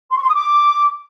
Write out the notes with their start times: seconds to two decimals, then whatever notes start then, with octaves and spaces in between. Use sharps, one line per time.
0.10 C6
0.16 C#6
0.22 C6
0.28 D#6
0.34 D6